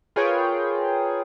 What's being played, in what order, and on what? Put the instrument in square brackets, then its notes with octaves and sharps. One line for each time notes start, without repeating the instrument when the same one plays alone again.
[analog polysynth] F4 G#4 A#4 B4 C#5 G5